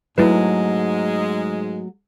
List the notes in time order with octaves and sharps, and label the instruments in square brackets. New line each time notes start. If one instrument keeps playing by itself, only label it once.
[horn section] G#2 G#3 [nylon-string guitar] F#3 A3 [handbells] E4 B4